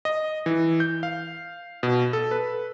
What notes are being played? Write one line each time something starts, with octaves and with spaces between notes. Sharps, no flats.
D#5
E3
G6
F5
B2
A4
B4